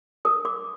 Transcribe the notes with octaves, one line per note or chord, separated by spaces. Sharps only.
A#4 D#6
A#4 D6